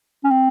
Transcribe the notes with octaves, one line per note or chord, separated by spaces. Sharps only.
C#4
C4